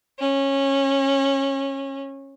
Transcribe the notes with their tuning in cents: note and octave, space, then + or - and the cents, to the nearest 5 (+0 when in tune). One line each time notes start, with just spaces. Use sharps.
C#4 -20